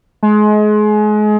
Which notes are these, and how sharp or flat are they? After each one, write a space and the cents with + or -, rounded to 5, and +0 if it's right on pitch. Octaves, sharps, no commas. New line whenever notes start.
G#3 +30